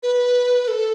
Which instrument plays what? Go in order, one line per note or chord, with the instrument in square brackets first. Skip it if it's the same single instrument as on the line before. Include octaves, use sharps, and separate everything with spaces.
[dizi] B4
A4